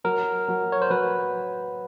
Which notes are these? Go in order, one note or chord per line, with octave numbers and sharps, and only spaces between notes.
F#3 A#4
F#3
C#5
C5
F#3 B4